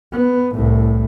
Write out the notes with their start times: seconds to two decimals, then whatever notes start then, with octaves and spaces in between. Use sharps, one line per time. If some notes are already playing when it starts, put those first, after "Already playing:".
0.12 B3
0.55 C2 A2